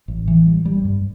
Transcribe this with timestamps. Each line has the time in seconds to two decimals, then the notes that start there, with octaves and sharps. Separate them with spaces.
0.08 A1
0.28 E3
0.46 G3
0.65 G3
0.85 G2